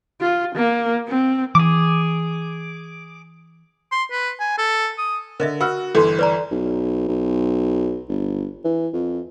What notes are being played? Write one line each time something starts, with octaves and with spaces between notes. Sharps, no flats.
F4
A#3
C4
E3 G#4 D6
C6
B4
G#5
A4
D#6
D3 A#4 D#5 E5
F#4 B5 E6 F6
G1 E3 A4 C6
B4 D5 A#5
B1
B1
G1
E3
F2